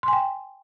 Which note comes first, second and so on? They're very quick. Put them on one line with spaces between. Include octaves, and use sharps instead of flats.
C6 G#5 G5